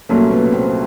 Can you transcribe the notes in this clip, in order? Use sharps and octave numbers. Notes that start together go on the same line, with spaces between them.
C2 A#2 F#3 A3 A#3 C#4
B3
C4